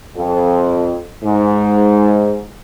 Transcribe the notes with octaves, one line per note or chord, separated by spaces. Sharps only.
F2
G#2